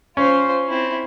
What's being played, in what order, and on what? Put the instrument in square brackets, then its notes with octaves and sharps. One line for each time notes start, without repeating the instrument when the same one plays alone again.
[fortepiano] C#4 [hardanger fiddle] F4 C5
[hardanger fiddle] C4 E4